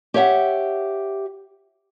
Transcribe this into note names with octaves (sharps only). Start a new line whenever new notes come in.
G4 C#5 E5 F#5